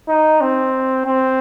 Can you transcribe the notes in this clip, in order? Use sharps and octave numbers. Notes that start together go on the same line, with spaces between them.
D#4
C4
C4